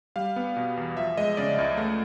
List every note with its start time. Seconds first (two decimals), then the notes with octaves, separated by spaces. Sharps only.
0.16 G3 F5
0.36 B3
0.56 B2
0.77 E2
0.97 F3 E5
1.17 G#3 D#5
1.37 C#3 D5
1.58 C#2
1.77 A3